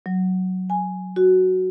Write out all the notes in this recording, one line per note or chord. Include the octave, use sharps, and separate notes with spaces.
F#3
G#5
F#4